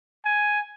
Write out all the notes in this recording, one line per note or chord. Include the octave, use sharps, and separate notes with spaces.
G#5